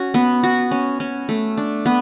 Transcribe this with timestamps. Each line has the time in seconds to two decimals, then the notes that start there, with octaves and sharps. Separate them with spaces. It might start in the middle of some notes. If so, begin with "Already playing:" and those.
Already playing: C#4 F#4
0.14 B3
0.43 F#4
0.71 C#4
1.00 C#4
1.29 A3
1.57 D4
1.86 B3